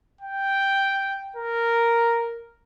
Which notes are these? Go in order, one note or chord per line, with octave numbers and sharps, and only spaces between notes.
G5
A#4